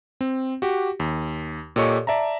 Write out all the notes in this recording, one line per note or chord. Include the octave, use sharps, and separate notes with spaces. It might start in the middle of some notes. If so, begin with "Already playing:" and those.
C4
F#4 G4
D#2
A#2 G4 A4 C#5 D#5 C#6
D5 E5 A5 A#5